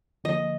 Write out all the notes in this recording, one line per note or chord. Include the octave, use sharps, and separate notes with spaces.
D3 F3 A#3 D#5